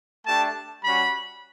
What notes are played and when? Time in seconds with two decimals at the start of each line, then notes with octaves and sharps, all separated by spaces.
0.26 A3 D4 G4 A5
0.84 G3 C#4 F#4 B5